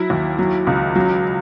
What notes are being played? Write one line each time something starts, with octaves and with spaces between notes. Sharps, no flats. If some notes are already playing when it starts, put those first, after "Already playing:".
Already playing: F#3 E4
D#2
F#3
C#2
F#3